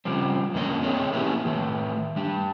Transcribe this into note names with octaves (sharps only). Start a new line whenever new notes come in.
C#3 F3 G3 C4
F2 D3 A#3 C#4 D#5
A3 C4 G#4 C#5 D#5
A3 A#3 C#4 E4 G4
A2 D#3 A3
G3 D4